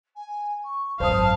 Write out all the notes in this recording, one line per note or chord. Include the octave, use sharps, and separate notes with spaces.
G#5
C#6
G#1 F#2 C5 F5 A5 D#6